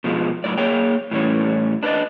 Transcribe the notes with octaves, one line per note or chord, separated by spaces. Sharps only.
B2 F3 G#3
F#2 A2 D5
A#3 G#4 C#5 G5
A2 E3 G3 C#4
D4 B4 C5 D5 D#5